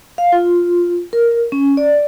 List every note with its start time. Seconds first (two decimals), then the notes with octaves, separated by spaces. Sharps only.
0.18 F5
0.32 F4
1.13 A#4
1.52 C#4
1.77 D5